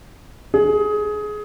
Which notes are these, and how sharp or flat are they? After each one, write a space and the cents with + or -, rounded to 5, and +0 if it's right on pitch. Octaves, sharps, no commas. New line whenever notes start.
G#4 +20